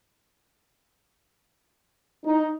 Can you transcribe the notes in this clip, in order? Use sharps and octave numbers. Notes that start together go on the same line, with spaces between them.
D#4